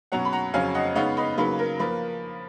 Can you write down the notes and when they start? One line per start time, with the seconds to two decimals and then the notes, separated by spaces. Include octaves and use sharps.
0.12 B2 F#3 C#4 F#5 A#5
0.25 B5
0.33 F#5 A#5
0.54 F2 C#3 F#3 C#4 F5 G#5
0.75 D#5 F#5
0.95 C#3 G#3 B3 D#4 C#5 F5
1.17 B4 D#5
1.37 C#3 F#3 A#3 D#4 B4
1.59 A#4
1.79 F3 A#3 B4